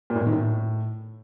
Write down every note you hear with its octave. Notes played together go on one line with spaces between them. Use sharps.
A#2
A2
B2
D#3
A2